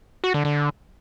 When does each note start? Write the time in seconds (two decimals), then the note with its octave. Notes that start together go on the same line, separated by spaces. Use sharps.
0.24 F#4
0.34 D3
0.45 D3